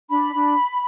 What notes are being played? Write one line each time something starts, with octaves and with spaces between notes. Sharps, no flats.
D4 B5
D4